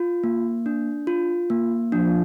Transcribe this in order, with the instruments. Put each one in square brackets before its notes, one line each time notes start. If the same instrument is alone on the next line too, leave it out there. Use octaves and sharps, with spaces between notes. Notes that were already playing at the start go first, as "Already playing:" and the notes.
Already playing: [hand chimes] F4
A#3
D4
F4
A#3
[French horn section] F3 [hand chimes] D4